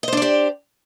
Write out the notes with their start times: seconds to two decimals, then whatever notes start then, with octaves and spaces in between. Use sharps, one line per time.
0.03 D#5
0.08 C5
0.13 D4
0.17 D5
0.22 G4